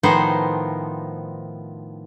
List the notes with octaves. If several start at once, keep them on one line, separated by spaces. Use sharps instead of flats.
A2 D#3 F3 B3 D#4 C5